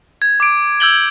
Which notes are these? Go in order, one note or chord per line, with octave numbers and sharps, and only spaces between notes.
G#6
D6 D7
E6 G6 G#6 F#7 G7